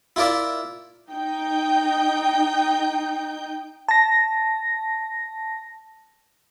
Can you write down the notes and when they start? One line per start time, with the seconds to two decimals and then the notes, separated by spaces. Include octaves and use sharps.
0.16 E4 F4 A#4 D5 E5
1.11 D#4 G5 G6
3.88 A5 A#6